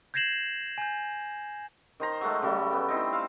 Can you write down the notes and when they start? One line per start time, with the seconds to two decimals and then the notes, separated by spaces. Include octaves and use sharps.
0.14 G6 G#6 A#6 C7 E7 F#7
0.78 G#5 G6
2.00 D#3 C5 A#5
2.21 F#3 G#3 A3
2.42 C#3 F#3 G3 A3
2.71 B3 G5
2.88 C4 D#4 E4
3.13 C5 F5